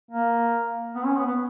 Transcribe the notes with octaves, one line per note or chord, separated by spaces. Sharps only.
A#3
B3
C#4
B3
B3